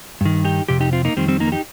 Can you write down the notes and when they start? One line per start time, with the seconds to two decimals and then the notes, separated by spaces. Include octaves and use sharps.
0.21 G2 D#3
0.44 D#4 G4
0.68 F2 C3 G4
0.80 D#4 G4
0.93 C4 F4
1.05 A#3 D#4
1.17 F2 D#3 G3 C4
1.28 G3 C4
1.40 A#3 D#4
1.47 A#4
1.52 D#4 G4